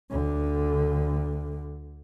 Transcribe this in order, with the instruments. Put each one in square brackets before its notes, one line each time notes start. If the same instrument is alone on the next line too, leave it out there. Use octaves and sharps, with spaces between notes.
[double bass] D2 D3